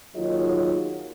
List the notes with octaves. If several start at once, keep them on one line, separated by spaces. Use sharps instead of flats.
D#2 F#3 D#4 F4 G#4 D#5